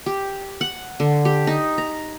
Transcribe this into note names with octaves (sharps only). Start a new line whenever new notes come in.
G4
F#5
D3
G4
D#4
A#5